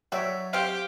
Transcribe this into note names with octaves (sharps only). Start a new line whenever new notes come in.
F#3 F#4 C#5 D5 E5 G5
C4 G4 F5